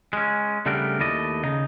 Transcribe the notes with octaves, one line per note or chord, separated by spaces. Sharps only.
G#3 C#4
C#3 G3 A3 B3 D4 A#4
D#2 A3 E4 D5 D#5
C#3 D#4